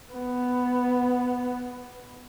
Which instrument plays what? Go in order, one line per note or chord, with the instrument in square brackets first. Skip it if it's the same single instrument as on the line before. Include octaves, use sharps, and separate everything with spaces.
[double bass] B3